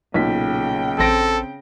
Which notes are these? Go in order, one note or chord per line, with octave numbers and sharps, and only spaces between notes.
B1 A#2 C#3 G5 B6
A1 C4 A4 A#6 D7